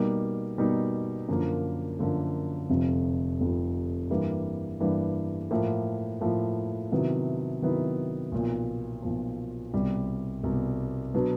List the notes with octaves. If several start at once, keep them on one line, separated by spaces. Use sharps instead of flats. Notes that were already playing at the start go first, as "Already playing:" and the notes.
Already playing: B2 G3 A#3 D#4
B2 G3 A#3 D#4
F#2 D3 F3 A#3
F#2 D3 F3 A#3
F1 F2 C3 F3
F1 F2 C3 F3
G2 E3 G3 A#3
G2 E3 G3 A#3
A2 F3 A#3
A2 F3 A#3
C3 D#3 F#3 B3 E4
C3 D#3 F#3 B3 E4
B1 A#2 F3
B1 A#2 F3
C2 B2 G3
C2 B2 G3
B2 F#3 B3 D4